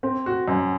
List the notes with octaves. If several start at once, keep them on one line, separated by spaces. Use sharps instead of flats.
C4
F#4
F#2